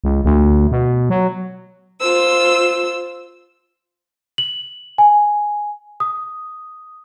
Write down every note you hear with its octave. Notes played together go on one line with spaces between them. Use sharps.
C#2
D2
B2
F#3
F4 C5 E6
F#7
G#5
D#6